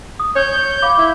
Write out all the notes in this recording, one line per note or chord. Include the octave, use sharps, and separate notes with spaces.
D#6
C#5 G6
F5 B5 D6
E4